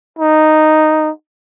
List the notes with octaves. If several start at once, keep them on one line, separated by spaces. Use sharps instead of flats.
D#4